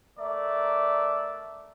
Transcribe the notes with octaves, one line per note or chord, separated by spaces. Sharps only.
A3 A#4 D5 E5